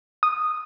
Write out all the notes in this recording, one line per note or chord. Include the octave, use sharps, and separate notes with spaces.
D#6